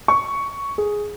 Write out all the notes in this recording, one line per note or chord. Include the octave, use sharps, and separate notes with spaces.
C#6
G#4